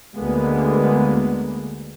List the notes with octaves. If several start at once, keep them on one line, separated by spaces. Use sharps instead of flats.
D2 D3 G#3 A#3 B3